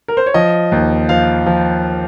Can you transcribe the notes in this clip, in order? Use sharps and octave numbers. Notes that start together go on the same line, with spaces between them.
A#4
C5
C#5
F3 D#5
D#2
F3 F5
F3